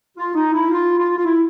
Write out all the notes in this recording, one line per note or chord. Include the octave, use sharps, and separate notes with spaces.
F4
D#4
E4
F4
F4
F4
E4